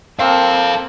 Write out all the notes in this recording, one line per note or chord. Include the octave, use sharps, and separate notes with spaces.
A#3 C4 A4 F5 A5